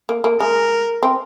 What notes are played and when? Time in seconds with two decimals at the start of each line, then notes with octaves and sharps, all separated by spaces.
0.09 A#3
0.24 A#3
0.40 G#3 A#4
1.03 C4